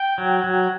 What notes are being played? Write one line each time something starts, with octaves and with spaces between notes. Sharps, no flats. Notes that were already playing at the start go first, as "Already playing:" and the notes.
Already playing: G5
F#3
F#3